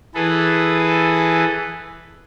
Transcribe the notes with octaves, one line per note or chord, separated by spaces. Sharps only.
E3 G#4 A4 B4